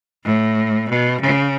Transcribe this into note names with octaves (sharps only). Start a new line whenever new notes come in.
A2
B2
C#3